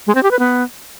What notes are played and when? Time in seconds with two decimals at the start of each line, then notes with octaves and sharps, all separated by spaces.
0.07 G#3
0.15 C4
0.23 G4
0.31 B4
0.39 B3